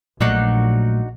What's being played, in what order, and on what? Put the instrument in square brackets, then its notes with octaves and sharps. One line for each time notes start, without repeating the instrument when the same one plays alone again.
[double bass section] A#1 [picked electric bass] A#2 F#3 A3 [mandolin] D4 D#4 F#4